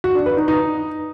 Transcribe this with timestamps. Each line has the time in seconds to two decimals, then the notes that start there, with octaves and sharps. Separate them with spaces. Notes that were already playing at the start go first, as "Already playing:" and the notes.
0.04 F#4
0.15 D4
0.26 B4
0.37 D#4
0.48 D#4